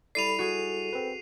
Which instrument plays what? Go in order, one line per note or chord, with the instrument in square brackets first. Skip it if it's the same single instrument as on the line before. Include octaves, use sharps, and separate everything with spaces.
[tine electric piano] G3 E4 D5 [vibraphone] A4 B5 [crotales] C7 D#7 F7
[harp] F#4 G#4 [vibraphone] A4
[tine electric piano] C4 B4